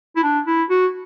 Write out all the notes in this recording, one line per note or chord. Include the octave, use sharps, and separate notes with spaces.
E4
D4
E4
F#4